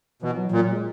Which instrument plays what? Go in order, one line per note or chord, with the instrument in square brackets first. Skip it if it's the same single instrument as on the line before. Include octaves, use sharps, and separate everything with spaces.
[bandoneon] B2 [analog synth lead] E3
[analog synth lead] F#3
[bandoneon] A#2
[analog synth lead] G#3